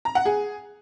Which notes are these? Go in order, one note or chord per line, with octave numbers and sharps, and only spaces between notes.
A#5
F#5
G#4